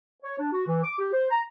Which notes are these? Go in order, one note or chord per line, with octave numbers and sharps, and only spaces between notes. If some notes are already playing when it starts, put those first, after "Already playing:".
C#5
D4
F#4
E3
D6
G4
C5
A#5